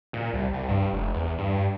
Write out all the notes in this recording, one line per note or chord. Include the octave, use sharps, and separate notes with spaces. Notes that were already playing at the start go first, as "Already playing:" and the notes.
A#2
C2
C2
G2
F1
E2
G2